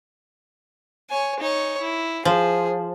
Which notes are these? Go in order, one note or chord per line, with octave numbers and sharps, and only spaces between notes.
C#5 G#5
D#4 C#5
E4
F3 G#4